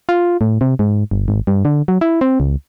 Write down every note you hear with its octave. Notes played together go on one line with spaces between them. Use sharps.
F4
A2
C3
G#2
G1
G#1
G2
D3
F#3
E4
C4
C#2